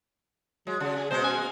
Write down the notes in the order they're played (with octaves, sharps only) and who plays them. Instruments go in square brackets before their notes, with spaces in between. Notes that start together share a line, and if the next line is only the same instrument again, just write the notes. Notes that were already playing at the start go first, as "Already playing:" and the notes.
[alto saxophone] F#3 [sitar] G#3
[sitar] C#3 [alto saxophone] F#4
[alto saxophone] G#4
[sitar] B2 G#3 F#4 [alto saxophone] C5
[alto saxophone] G#5
[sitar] A#3